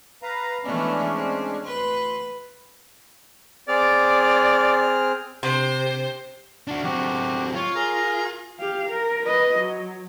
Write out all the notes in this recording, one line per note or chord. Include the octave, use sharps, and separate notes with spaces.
B4 F5 A#5
E3 G#3 A3 B3 C#4 D4
C4
D2 B4 C6
C4 G#4 D5 F6
C3 C5
D4 F#4
F#3 C4 F#4 G4
F4 C#5
G#4 A#4 A#5
G4 F5
A#4
B4 D#5
F#3